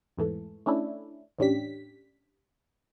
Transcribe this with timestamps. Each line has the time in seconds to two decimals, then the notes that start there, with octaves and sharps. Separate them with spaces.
0.17 E2 G#2 E3 A3
0.66 A3 C#4 D4 E4
1.38 E2 A2 C#4 D4 G4 B6